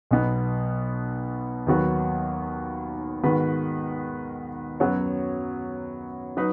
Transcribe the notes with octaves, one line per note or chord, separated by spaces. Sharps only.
B1 B2 B3
D#2 D#3 F#3 B3 F#4
G#2 D#3 B3 F#4 B4
F#2 F#3 B3 F#4 C#5
F#3 D#4 B4